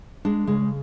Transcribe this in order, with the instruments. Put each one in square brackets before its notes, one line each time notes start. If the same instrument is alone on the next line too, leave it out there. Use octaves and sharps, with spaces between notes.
[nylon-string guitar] G#3 [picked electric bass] D4
[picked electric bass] C#3 [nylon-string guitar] G#3